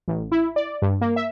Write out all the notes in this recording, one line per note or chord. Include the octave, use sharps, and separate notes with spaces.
A1
E4
D5
G2
A#3
E5